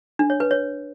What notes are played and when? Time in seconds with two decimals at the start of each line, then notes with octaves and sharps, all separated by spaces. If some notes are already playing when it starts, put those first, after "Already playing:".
0.19 D4
0.30 C#5
0.40 B4
0.51 C#5